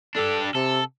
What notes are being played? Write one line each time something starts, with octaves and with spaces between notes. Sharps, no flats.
D4 G4 A4
C3 A4